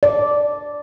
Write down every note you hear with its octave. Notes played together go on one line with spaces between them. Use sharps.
D5